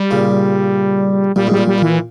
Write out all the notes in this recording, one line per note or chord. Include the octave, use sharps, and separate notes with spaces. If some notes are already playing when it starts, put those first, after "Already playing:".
Already playing: G3
A#2 C#3
A#2 G3
G#2 G3
A#2
G3
A#2 E3